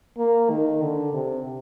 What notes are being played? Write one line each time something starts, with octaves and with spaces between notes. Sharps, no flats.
A#3
D#3
D3
C3